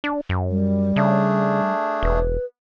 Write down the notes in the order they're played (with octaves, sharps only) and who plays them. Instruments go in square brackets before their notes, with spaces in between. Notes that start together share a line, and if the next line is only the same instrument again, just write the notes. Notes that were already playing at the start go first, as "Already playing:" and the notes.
[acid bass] D4
F#2
[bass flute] G3
[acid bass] C#3 [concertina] A3 D4 G#4
[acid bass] E1 [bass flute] B4